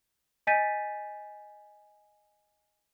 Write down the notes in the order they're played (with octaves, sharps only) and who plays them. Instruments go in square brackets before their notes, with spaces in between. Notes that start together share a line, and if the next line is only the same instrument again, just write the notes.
[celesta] D#5 G#5 G6 A6 B6 D#7